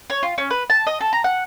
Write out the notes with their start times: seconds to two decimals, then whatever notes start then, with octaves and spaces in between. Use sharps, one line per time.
0.10 C#5
0.23 F4
0.38 C#4
0.50 B4
0.70 A5
0.87 D#5
1.01 A4
1.13 A#5
1.24 F#5